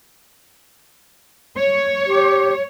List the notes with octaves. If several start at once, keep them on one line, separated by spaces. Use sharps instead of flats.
C#5
G4